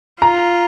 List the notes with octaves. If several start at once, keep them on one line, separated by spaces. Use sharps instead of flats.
F4 A#5